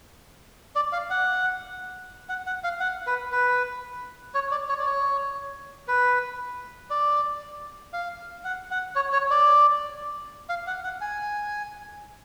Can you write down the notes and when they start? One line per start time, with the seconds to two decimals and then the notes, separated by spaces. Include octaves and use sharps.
0.76 D5
0.93 F5
1.10 F#5
2.29 F#5
2.47 F#5
2.64 F5
2.80 F#5
3.07 B4
3.32 B4
4.34 C#5
4.51 D5
4.69 C#5
4.79 D5
4.86 C#5
5.88 B4
6.90 D5
7.93 F5
8.44 F#5
8.71 F#5
8.95 C#5
9.13 C#5
9.30 D5
10.49 F5
10.67 F#5
10.84 F#5
11.01 G#5